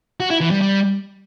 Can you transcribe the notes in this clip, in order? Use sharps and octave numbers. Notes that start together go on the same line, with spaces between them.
F#4
E4
E3
G3
G3